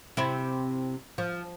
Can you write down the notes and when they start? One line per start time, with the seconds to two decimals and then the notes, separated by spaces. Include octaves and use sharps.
0.17 C3 C4 E4
1.18 F3